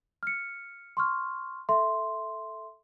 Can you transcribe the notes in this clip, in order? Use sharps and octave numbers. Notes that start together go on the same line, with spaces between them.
F6 C#7
C6 C#6 F6
A4 E5 C6